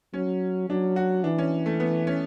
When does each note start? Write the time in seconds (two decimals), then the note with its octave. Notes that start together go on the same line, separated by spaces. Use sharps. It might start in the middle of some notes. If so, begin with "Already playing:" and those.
0.14 F#3 C#4
0.69 F#3 D4
0.96 F#4
1.24 E3 D4
1.38 C#4
1.66 A3
1.80 B3
2.07 C#4